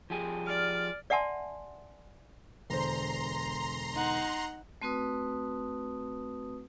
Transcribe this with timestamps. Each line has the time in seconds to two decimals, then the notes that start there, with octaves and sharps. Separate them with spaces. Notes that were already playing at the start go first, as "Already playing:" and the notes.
0.10 F3 G4 G#4
0.47 D5 F6
1.10 D5 E5 F#5 G#5 A5 C6
2.70 E1 D3 C5 A#5 C6
3.94 D#4 F#5
4.82 A3 C4 F#4 B4 D#6